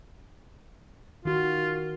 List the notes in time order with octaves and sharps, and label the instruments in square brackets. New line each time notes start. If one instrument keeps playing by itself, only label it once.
[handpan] D#3 F#4 [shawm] F4